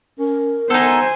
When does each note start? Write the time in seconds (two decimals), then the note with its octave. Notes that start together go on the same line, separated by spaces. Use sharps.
0.19 C#4 A#4
0.70 B3 D#4 A4 C5 G#5